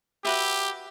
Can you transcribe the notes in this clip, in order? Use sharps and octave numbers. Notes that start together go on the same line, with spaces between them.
F#4 G4 B4 E5